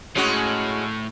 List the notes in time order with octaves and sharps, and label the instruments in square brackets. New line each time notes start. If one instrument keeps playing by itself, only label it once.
[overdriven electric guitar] A2 [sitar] G#3 C#4 F#4